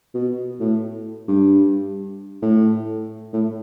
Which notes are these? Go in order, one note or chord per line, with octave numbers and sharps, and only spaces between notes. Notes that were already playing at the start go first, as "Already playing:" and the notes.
B2
A2
G2
A2
A2